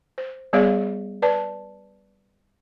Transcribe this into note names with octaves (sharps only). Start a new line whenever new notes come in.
C5
G3 B3 G#4 C#5 D5 F5
B4 D5 A5